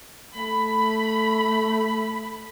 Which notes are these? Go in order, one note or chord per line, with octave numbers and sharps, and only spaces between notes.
A3 B5